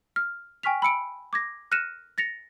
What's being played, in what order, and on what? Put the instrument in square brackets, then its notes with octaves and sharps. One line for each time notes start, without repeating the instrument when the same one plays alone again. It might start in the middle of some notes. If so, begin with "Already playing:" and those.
[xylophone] F6
G5 G#5 C#6 F6 B6 F7
B5 E6 C#7 D7
D6 G#6 A#6
F6 F#6 A#6 C#7 D#7 E7
A6 A#6 C#7 F7